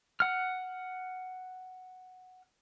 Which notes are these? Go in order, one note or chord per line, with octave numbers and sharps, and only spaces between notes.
F#5 F6